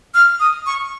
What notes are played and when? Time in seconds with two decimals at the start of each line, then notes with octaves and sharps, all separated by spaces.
0.15 F6
0.40 D#6
0.66 C#6